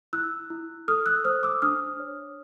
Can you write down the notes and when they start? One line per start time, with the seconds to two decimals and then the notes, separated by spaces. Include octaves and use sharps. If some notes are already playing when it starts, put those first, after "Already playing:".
0.13 E4 E6 F#6
0.50 E4
0.88 A4 D#6 F6
1.06 E6 F#6
1.25 C5 D#6 F6
1.43 D6 E6
1.62 D4 D#6 F6
2.00 C#5